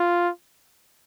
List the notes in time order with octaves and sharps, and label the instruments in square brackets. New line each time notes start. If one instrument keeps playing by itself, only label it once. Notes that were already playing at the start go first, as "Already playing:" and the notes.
Already playing: [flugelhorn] F4